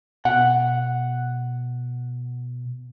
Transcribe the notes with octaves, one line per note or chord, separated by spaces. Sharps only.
B2 F#5